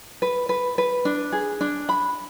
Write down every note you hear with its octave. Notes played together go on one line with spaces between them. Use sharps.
B4
B4
B4
D4
G#4
D4
B5